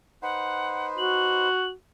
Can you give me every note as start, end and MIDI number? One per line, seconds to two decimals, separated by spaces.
0.22 1.48 63
0.22 1.48 71
0.22 1.48 72
0.22 0.87 78
0.98 1.72 66
0.98 1.69 102